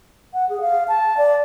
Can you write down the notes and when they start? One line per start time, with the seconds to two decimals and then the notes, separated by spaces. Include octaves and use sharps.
0.34 F#5
0.49 G#4
0.61 F5
0.88 A5
1.17 D5